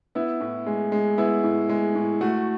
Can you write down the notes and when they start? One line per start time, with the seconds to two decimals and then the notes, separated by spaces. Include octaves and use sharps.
0.15 B3 E4
0.41 A2
0.66 G#3
0.92 G#3
1.18 B3 E4
1.44 A2
1.69 G#3
1.95 A2
2.21 A3 F#4